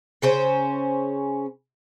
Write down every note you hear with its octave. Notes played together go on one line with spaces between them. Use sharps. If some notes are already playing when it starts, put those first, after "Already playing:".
C#3 C#4 C5